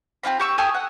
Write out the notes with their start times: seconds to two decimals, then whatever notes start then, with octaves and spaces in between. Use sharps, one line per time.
0.23 C4 E4 F4 B5
0.40 G4 C#6 E6
0.58 G4 A4 G#5 D#6
0.74 F#5